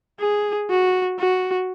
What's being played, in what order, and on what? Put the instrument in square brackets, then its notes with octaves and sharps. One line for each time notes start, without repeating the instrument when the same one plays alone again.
[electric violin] G#4
F#4
F#4